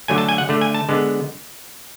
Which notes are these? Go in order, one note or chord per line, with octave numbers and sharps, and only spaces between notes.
D3 F#3 A3 G#5
A5
G#5
F#5
D3 A3
G#5
A5
D3 G#3 B3